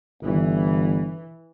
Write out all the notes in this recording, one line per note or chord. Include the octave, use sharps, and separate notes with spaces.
G1 E3